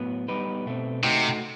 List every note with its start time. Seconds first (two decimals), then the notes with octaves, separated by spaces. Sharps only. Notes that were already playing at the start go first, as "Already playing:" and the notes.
Already playing: A2 F#3 B3
0.28 G3 B3 D#4 G4 B4
0.66 B2 A3 C4
1.03 C3 A3 D#4 F#4